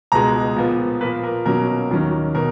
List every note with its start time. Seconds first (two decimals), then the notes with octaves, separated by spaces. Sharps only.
0.12 C#2 B2 G#3 A#5
0.56 A#2 F3 B3
1.01 A#2 F3 A#3 B4
1.24 A#4
1.46 B2 F#3 A#3 C#4 A#4
1.91 D#2 D#3 F#3 C#4
2.35 B2 A#4